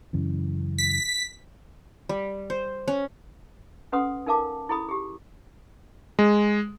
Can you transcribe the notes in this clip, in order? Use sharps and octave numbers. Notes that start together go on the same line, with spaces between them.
F#2 C#3 E3
B6
G3
C5
C#4
C#4 A4 B4 F#5 C6 D#6
D#4 A4 A#4 F5 A5 D6
E4 G#4 A4 B5 D#6
G4 G#4
G#3